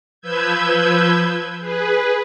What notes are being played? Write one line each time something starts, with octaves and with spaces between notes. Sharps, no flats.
F3 B4 E6 G6 G#6
G#4 B4